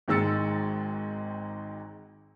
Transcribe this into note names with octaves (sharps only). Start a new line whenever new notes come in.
G#1 D#3 G#3 E6 A6 C#7